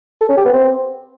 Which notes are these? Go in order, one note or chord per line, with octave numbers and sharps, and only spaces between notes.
A4
C#4
G4
B3
C4